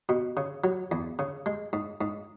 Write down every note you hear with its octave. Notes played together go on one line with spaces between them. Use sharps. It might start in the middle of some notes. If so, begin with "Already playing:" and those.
B2
C#3
F#3
E2
C#3
G#3
G#2
G#2